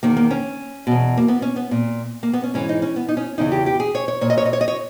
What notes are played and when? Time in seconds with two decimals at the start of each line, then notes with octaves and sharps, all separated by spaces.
0.03 E2 D#3 A#3
0.17 A#3
0.31 C#4
0.87 E2 B2
1.17 A#3
1.28 B3
1.42 C#4
1.56 B3
1.71 A#2
2.23 A#3
2.33 B3
2.44 C#4
2.54 G#2 E3 C#4
2.69 D#4
2.82 C#4
2.96 B3
3.09 D#4
3.17 C#4
3.38 E2 C#3 E3 D#4
3.52 G4
3.66 G4
3.80 G#4
3.95 C#5
4.08 C#5
4.21 A#2 C#5
4.30 D#5
4.38 C#5
4.46 D#5
4.53 C#5
4.61 D#5
4.68 C#5